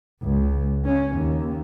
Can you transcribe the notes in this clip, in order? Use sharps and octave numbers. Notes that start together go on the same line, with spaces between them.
C#2
C#4
D#2